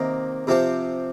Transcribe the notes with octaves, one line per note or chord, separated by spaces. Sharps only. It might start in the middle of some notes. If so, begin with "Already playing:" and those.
Already playing: C3 D#3 A#3
C3 F3 C4 G4